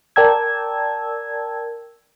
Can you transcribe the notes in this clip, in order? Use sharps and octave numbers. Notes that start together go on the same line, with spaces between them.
A#4 D5 G5 A5 E6 G#6